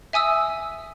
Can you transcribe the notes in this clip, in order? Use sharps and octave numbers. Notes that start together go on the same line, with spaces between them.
E5 G#5 D#6 E6